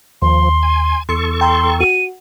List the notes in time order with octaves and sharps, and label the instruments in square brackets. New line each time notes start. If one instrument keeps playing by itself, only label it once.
[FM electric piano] D#2 [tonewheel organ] F3 [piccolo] C6
[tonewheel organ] G#5
[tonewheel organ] E2 A4 C#6 [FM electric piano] C6 C#7
[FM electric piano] G5 A#5 E6 [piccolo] C6
[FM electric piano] F#4 [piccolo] D#7